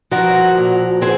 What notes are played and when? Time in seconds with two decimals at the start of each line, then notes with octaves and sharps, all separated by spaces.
0.11 F3 F#4 A#4
0.57 A#2
1.01 C4 G#4 C5